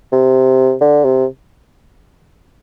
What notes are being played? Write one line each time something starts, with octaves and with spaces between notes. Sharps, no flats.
C3
D3
C3